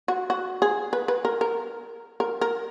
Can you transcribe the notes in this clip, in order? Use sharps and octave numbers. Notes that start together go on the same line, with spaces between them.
F#4
F#4
G#4
B4
B4
A#4
A#4
A#4
A#4